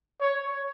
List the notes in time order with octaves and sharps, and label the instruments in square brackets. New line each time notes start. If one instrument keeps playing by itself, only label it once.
[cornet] C#5